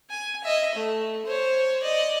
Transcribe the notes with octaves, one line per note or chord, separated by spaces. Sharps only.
G#5
D#5 E5
A3
C5 C#5
D5 D#5